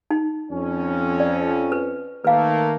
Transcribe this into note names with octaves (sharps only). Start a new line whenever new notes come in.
D#4
F2 C#4
D5
B4
D#3 A3 A#3 B4 F5